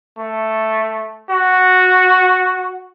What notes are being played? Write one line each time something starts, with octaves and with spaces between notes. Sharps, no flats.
A3
F#4